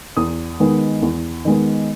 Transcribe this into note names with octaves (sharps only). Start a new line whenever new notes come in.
E2 D#6
D#3 G#3 B3
E2
D#3 G#3 B3